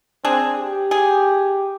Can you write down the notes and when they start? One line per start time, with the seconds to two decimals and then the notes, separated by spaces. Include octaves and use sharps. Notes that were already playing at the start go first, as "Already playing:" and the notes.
0.25 C4 D4 G#4
0.58 G4
0.91 G#4